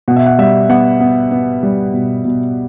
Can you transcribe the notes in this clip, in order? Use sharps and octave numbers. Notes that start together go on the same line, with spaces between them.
B2 F#5
E5
F#5
G3 E5
B3 F#5
B3
B3
G3
B2
B2